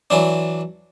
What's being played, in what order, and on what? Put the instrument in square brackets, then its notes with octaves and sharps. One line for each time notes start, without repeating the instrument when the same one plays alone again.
[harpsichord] E3 F#3 D4